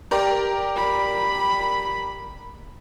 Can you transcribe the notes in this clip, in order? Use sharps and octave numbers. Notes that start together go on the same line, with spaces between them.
G4 A#4 D5
B5